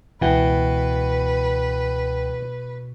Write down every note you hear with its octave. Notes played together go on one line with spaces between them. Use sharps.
C#2 B2 E3 B4 F#5 G5